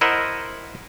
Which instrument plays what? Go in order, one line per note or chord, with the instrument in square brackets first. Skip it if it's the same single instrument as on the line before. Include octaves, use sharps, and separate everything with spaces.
[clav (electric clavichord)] E4 A#4 C5 D#5 E5 F#5